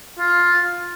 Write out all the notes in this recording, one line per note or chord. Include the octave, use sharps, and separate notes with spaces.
F4